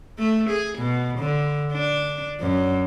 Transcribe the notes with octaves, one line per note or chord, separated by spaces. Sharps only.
A3
G#4
B2
D3
D4
F#2